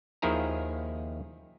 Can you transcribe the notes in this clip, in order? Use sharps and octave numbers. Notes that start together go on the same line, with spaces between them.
D#2 D#3 F3 E4 G#4 A#5